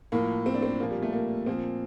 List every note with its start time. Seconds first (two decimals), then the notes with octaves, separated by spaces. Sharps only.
0.12 A2 F3 A#3
0.46 C4
0.54 D4
0.62 C4
0.80 A#2 F3 A#3
0.91 G3
1.02 A3
1.13 A#3
1.46 A#2 F3 C4